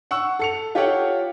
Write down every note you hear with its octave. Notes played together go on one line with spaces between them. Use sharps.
F#5 C#6 E6
A4 C#7 F7
F4 G4 A4 C#5 F#5 G5